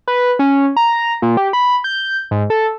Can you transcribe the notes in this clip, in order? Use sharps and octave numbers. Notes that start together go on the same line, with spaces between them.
B4
C#4
A#5
A#2
G4
B5
G6
G#2
A4